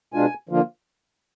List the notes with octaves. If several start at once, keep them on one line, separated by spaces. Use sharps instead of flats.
B2 G#3 D4 F4 G#5
D3 F3 A#3 F4